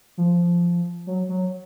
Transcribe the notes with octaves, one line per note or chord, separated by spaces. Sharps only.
F3
F#3
F#3